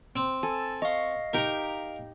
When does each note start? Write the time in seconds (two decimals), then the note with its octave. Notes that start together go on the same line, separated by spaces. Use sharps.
0.16 C4
0.43 A4 G#5
0.82 D#5 F5 C#6
1.33 D#4 G4 A#4 A#5